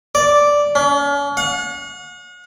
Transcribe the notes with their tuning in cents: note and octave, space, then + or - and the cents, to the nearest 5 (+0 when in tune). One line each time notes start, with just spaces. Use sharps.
D5 -5
C#4 +40
F#5 -45